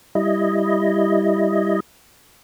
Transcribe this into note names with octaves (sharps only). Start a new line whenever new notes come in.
G3 E4 D#5